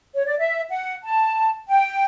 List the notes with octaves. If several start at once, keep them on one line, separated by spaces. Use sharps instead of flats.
C#5
D5
E5
F#5
A5
G5